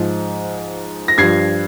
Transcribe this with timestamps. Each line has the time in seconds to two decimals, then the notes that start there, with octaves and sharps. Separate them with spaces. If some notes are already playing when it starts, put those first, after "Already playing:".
Already playing: G#2 F3
1.08 A#6
1.18 G2 F3 G#6 C7